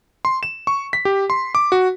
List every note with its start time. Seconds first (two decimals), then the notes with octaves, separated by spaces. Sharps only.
0.25 C6
0.43 E7
0.67 C#6
0.93 B6
1.05 G4
1.30 C6
1.55 D6
1.72 F#4